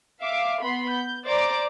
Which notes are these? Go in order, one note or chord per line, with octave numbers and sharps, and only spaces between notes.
E5 F5 D6
B3 B5 C6
G6
C5 D5 A#5 D6 D7